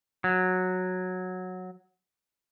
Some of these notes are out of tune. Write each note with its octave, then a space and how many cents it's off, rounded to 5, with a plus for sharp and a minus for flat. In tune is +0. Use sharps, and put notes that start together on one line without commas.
F#3 -10